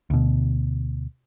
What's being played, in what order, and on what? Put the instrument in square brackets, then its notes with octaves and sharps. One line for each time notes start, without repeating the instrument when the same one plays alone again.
[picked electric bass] D2 B2